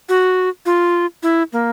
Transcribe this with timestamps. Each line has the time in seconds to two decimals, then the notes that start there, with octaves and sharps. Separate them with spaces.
0.09 F#4
0.66 F4
1.23 E4
1.53 A#3